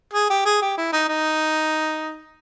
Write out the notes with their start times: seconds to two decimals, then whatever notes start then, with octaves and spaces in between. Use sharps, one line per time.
0.13 G#4
0.30 G4
0.45 G#4
0.62 G4
0.77 E4
0.92 D#4
1.08 D#4